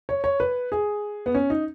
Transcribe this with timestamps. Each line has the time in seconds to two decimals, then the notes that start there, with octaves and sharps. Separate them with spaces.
0.09 C#5
0.24 C#5
0.40 B4
0.72 G#4
1.26 B3
1.35 C#4
1.50 D#4